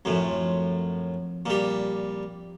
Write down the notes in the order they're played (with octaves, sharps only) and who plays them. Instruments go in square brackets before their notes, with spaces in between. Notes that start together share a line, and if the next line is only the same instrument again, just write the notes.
[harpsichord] F#2 A2 [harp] F3 C4
[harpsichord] A#2 G3